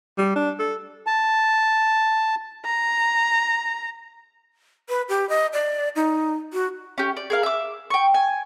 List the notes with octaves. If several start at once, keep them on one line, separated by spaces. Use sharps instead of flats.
G3
D4
A4
A5
A#5
B4
G4
D#5
D5
D#4
F#4
C#4 G4
D5
G#4 A#4 F5
E5 D6
G5 C#6
G#5